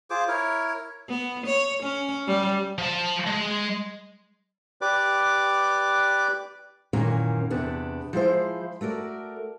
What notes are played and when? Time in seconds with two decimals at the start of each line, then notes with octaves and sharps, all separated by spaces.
0.10 F4 G#4 C5 D6
0.28 E4 A#4 C#5
1.09 B3
1.46 C#5
1.83 C#4
2.27 G3
2.78 F3 A5
3.27 G#3
4.81 G4 B4 D5 D6
6.93 F#2 A#2 D#3 E3 A#3 C#4
7.50 E2 C3 B3 D4
8.13 F3 G#3 E4 C5
8.81 A3 F#4 A#4 D5